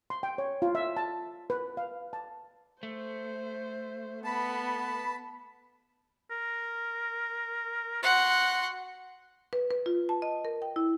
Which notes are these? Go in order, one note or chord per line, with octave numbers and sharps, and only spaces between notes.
C6
G5
C#5
F4
E5
A5
B4
F5
A5
A3 C5
B3 A5 B5
A#4
F#4 F#5 C6
B4
B4
F4
A5
D#5
A#4
G5
E4